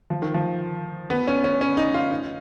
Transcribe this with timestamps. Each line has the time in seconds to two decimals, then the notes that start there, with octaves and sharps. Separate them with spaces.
0.10 F3
0.22 D#3
0.34 F3
1.10 B3
1.27 C#4
1.44 C#4
1.61 C#4
1.77 D#4
1.94 F4
2.11 D#4